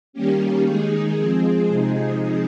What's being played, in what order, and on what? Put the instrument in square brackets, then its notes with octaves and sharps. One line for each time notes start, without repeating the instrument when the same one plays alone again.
[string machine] D#3 G3 A#3 C#4 G4
D#3 G#3 D#4 G#4
F3 G#3 C4 G#4
C3 F3 G#3 D#4